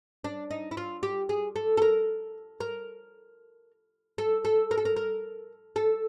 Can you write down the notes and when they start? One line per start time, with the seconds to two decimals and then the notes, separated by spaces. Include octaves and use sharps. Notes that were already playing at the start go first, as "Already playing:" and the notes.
0.24 D4
0.51 D#4
0.71 E4
0.77 F4
1.03 G4
1.29 G#4
1.56 A4
1.77 A4
1.82 A#4
2.60 A#4
4.18 A4
4.45 A4
4.71 A#4
4.77 A4
4.85 A#4
4.96 A#4
5.76 A4